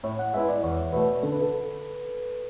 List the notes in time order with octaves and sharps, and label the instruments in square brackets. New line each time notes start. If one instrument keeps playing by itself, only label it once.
[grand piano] A2 [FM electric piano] C#5
[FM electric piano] F#5
[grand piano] G#3 B3 E4 [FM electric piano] E5
[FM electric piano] D5
[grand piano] E2 [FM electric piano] C#5
[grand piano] B2 A3 [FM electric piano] B4
[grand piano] D3 [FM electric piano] A4
[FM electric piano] B4
A4